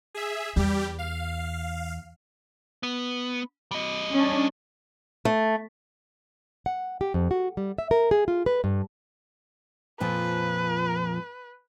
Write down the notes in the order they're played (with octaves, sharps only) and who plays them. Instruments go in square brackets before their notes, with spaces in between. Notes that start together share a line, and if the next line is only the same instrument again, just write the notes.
[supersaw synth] G#4 E5
[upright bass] E2 [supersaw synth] G3 G4
[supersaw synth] F5
[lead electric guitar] B3
G3 D#5
[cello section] C#4 D4
[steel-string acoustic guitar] A3
[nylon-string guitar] F#5
G4
F2
F#4
G3
E5
A#4
G#4
F4
B4
G2
[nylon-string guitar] F2 A#2 F3 [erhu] B4